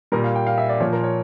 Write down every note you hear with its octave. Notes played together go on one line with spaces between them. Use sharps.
A#2 G3 A#4
F5
G5
F5
E5
D5
A#2 F3 C#5
A#4
C#5